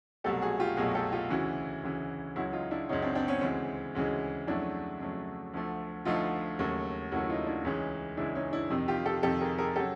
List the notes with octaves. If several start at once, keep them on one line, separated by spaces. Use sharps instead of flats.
C2 B2 F#3 A3 G4 A4
F#4 G#4
F4 G4
C2 B2 F#3 A3 F#4 G#4
G4 A4
F4 G4
D2 C#3 E3 E4 F#4
D2 C#3 E3
C#2 C#3 F#3 E4 F#4
D#4 F4
D4 E4
C#2 C#3 F#3 C#4 D#4
C4 D4
C4 D4
B3 C#4
D2 C#3 E3 G#3 C4
D2 C#3 E3 G#3
F2 C#3 F#3 A3 D4 E4
F2 C#3 F#3 A3
D2 D3 F3 A3
D2 D3 F3 A3 D#4 F4
D#2 C#3 F#3 A3
D#2 C#3 F#3 A3 E4 F#4
E4
D#4 F4
D4 E4
C#2 C#3 E3 G#3 C#4 D#4
C#2 C#3 E3 G#3 D4 E4
C#4 D#4
D4 E4
F2 C3 D#3
F4 G4
G4 A4
F2 C3 D#3 G4 A4
G#4 A#4
G#4 A#4
C#3 F#3 G4 A4